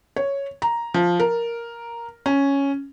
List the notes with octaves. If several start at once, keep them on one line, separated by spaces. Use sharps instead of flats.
C#5
A#5
F3
A#4
C#4